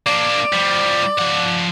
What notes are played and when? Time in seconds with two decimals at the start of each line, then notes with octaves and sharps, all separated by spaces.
0.06 A#3 D4 D5
0.53 F3 G3
1.19 F3 F#5